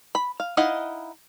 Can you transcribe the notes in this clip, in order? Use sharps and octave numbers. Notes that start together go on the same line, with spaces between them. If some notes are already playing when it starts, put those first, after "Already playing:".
B5
F5
D#4 E4 D#5 F5 F#5